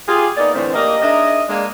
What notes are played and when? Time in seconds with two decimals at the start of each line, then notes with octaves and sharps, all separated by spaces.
0.08 F4 G4 G#4
0.37 A#3 B3 D#4 G#4 D5
0.54 A2 D3 E3 A3 C4
0.74 A#3 D4 G4 A#4 D#5
1.02 D4 D#4 G#4 A#4 D#5 E5
1.49 G#3 A#3 D4